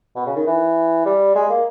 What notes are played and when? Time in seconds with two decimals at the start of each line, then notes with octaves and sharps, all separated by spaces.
0.16 B2
0.26 C#3
0.36 D#3
0.46 E3
1.05 G3
1.35 G#3
1.49 A#3